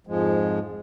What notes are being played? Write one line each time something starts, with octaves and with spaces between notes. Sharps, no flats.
F2 G#2 F3 G#3